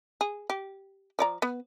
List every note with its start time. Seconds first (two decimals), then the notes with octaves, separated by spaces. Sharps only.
0.21 G#4
0.50 G4
1.19 F3 D5 A#5
1.42 B3